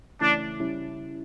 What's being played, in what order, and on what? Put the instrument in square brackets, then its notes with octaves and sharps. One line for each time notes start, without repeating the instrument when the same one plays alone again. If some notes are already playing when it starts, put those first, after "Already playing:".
[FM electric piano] C#3 E3 A3 C#4 E4 [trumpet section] D4
[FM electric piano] C#3 G3 C#4 E4